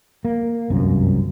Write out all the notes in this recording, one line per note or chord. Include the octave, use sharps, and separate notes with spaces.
A#3
G1 C2 F#2 F3